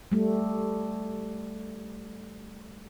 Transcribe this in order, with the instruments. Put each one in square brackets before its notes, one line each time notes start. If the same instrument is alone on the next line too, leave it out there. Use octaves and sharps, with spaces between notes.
[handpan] G3 A3